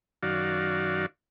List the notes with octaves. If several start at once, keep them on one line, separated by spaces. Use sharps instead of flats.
F#2 D#3 F#4 D5 F5